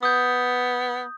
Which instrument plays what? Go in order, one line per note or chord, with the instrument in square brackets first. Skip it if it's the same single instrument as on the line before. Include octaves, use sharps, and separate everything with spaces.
[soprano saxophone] B3 [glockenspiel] D#6 G6